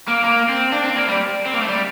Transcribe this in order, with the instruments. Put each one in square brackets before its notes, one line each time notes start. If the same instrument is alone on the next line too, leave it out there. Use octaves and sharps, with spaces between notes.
[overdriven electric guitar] A#3
A#3
C4
D4
C4
A#3
G3
C4
A#3
A3
G3